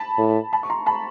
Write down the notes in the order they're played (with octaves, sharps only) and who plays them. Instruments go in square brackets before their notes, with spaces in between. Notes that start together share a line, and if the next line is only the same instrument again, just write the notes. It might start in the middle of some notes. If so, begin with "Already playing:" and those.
Already playing: [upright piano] A5 B5
[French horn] A2
[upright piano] A5 B5
C#6
A#5 C6
A5 B5